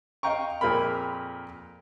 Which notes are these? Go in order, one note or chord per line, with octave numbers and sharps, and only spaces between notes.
D#5 F5 G5 A#5 C#6
F2 A#2 G#4 A#4 B5